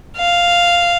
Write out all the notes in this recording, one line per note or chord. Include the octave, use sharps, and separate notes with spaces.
F5